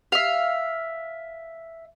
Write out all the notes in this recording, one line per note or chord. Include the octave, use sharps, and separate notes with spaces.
E5 F5